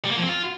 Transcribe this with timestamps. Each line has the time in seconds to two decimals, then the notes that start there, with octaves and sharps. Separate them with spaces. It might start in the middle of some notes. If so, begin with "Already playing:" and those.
0.05 G3
0.11 A#3
0.17 F3
0.23 C4
0.29 F4